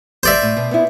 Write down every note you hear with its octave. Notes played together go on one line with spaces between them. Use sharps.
C5 D5 E5
A2
B2
B3 E4